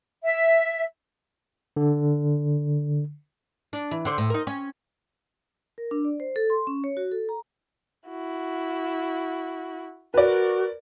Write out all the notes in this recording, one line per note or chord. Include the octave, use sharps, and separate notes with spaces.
E5
D3
D4
E3
D3 C5 D5
A2
D#4 A#4
C#4
A#4
D4
D5
C5
A4
C6
C#4
C#5
F#4
A4
A#5
E4 F#4
F#4 A#4 B4 D5